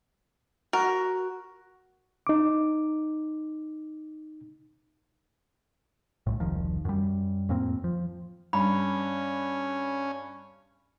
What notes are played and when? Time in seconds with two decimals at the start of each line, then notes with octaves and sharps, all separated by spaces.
0.73 F#4 A#4
2.27 D#4 D6
6.27 B1 A2
6.40 E1 C2 D#3 F3
6.85 F#2 G3
7.49 F2 A2 A#3 C4
7.84 F3
8.53 G2 C#4 B5